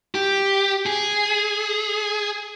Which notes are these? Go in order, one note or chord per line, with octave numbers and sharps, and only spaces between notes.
G4
G#4